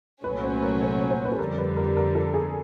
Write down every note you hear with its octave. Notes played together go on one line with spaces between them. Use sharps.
C2 A#2 F#3 A3 C#4 B4
C5
A#4
C5
C#5
C5
B4
A4
F2 D3 G3 A#4
B4
A#4
A#4
A4
G#4